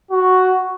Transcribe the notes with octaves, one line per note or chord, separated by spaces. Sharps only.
F#4